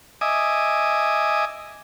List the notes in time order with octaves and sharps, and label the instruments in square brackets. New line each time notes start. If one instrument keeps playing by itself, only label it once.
[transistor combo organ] D#5 E5 G#5 D6 D#6